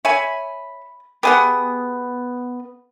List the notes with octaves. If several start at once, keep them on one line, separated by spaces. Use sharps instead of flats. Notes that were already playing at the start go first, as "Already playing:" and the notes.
C#5 E5 G#5 B5
B3 G4 G#4 F#5